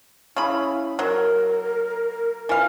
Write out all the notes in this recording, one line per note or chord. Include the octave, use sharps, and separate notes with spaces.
C#3 E4 B5
F#3 A#4
E3 F4 F5